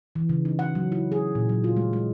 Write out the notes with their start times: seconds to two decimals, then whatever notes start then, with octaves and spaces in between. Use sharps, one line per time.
0.16 E3
0.29 C#3
0.45 D#4
0.59 F#5
0.75 F#3
0.92 E4
1.12 G#4
1.35 A#2
1.49 F#3
1.64 F4
1.77 G#3
1.93 G#3